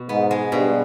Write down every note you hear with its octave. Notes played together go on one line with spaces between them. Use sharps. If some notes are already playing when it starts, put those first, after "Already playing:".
Already playing: B2
G#2 B3
G#3
G2 B2